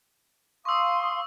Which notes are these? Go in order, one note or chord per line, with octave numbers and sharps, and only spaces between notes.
F5 C6 C#6 D#6 E6